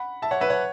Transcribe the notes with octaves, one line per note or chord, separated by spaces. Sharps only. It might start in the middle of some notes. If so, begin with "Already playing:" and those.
Already playing: F#5 B5
E5 A5
C#5 F#5
B4 E5
C#5 F#5